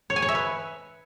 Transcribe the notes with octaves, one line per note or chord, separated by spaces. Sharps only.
C#5
G#5
C#5
E5
B4